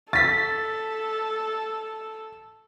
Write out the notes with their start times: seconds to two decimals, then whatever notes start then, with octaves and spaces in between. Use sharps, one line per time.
0.13 A4 A6 B6